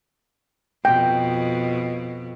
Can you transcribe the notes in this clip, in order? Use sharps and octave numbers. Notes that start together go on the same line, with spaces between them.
F2 B2 G5